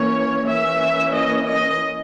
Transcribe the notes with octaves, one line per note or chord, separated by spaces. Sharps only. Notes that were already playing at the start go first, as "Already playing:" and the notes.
Already playing: E3 A#3 C#4 C#5
E3 A#3 C#4 E5
D#5
D#5